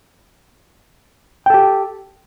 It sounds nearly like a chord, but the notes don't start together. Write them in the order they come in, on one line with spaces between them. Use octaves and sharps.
G5 A4 G4